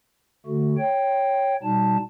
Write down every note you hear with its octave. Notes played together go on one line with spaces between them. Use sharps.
D3 A3 F#4
C#5 G5
B2 G3 D#4 A5